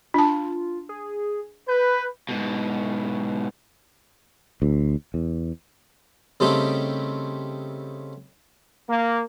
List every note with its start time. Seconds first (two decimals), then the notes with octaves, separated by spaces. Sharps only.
0.14 D4 F4 A5
0.89 G#4
1.68 B4 G6
2.29 G#2 B2
4.62 D2
5.14 E2
6.40 C#3 G3 A3 C4 D#4 G4
8.89 A#3